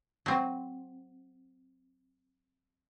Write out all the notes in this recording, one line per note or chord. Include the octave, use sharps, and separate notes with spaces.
F#3 C4